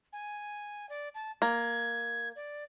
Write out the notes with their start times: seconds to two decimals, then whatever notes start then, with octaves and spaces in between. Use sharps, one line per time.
0.13 G#5
0.89 D5
1.15 A5
1.42 A#3 G#6
2.36 D5